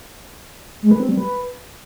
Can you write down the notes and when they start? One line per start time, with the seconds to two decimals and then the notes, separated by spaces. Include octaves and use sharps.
0.82 G#3
0.91 B4
1.00 C4
1.09 G3
1.17 B4